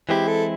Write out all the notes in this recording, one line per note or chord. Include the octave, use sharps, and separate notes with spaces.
E3 G#3 C4 E4 G4
A4